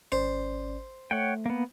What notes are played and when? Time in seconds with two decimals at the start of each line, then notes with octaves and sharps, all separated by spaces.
0.12 G#1 C#4 C5 D5
1.11 A3 C#5 F#5 G5
1.46 A#3 B3